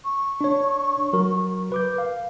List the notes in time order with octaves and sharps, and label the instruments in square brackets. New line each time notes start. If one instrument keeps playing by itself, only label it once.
[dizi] C#6
[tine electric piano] D4 C#5
F#3 F#4 A#4
B4 D6 G6
F5